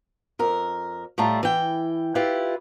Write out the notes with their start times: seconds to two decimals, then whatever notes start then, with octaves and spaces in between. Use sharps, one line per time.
0.39 F2 A#4
1.18 A2 G3 A3 F4 A5 A#5
1.43 E3 G5
2.15 E4 F4 G4 B4